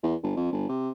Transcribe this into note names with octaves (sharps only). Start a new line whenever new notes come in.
E2
G1
F2
G1
C3